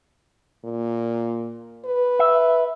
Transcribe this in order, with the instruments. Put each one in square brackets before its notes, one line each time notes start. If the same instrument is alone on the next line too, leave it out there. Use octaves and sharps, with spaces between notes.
[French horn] A#2
B4
[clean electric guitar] E5